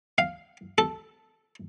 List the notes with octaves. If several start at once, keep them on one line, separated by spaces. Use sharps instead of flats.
F5
A4